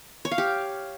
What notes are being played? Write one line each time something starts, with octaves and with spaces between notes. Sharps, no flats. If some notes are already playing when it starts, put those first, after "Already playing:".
C#5
F5
G4